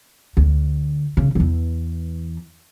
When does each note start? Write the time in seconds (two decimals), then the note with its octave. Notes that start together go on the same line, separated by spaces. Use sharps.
0.37 D2
1.17 C#3
1.35 E2 E3